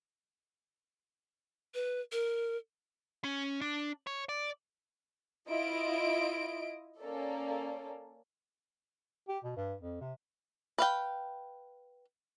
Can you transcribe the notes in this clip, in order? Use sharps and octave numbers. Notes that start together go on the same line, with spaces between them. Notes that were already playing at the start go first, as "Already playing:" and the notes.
B4
A#4
C#4
D4
C#5
D5
E4 F4 D#5 D7
A#3 C#4 A4 D5
G4
B2
G2
F2
C3
B4 F5 G5